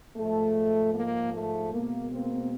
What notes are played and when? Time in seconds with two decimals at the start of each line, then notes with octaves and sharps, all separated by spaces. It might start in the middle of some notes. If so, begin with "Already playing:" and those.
0.16 G#2 F3 G#3 A3
0.94 A#3
1.34 A3
1.73 B2 G#3 A#3
2.12 A#3 C4